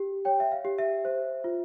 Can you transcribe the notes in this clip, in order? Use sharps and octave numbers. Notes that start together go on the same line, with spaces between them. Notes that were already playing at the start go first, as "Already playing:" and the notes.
Already playing: G4
C#5 G5
E5
F5
G4
E5
C5
F4